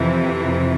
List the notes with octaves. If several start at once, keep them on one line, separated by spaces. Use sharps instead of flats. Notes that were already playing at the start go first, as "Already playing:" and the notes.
Already playing: F2 C3 E3